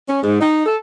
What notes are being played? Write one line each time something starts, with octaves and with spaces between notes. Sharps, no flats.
C#4
G#2
D#4
A4